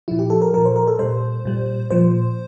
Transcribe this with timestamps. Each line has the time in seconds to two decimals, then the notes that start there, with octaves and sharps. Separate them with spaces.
0.08 A#2 F3 E4
0.19 G4
0.30 A4
0.42 A#4
0.53 A#2 F3 A#4
0.65 C5
0.76 A#4
0.87 A4
0.99 A#2 G3 C5
1.45 A#2 G3
1.91 A#2 F3 C5